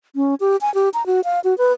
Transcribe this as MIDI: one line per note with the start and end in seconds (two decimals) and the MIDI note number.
0.16 0.35 61
0.40 0.57 67
0.61 0.73 80
0.74 0.89 67
0.94 1.05 82
1.06 1.21 66
1.24 1.40 77
1.44 1.57 66
1.58 1.73 71